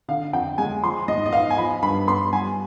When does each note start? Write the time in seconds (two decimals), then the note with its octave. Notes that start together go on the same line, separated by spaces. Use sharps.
0.08 D3 F5
0.33 F2 G5
0.58 G#3 G#5
0.83 F3 C6
1.08 G#2 D#5
1.26 D#5
1.33 B3 F5
1.50 G#5
1.58 F3 B5
1.82 G2 B5
2.08 B3 C6
2.33 G3 G#5